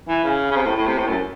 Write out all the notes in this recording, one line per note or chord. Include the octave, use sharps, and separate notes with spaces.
E3
C#3
C#3
C3
A2
A2
C3
A2
F#2